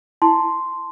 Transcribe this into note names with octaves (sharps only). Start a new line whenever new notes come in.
E4 A5 C6